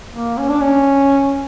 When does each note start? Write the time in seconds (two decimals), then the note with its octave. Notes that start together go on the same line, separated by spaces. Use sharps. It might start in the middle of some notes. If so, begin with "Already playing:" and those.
0.12 A#3
0.38 C#4
0.49 D4
0.60 C#4